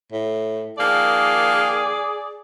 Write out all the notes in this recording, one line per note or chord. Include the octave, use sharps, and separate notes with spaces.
A2
D#3 F3 A#3 G#4 D5